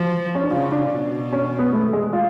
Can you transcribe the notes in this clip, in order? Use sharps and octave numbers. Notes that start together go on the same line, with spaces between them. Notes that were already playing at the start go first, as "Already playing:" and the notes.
Already playing: F3 F#4
C#4
D4
C#3 F4
F4
D4
B2
C#4
B3
A3
G#3
F4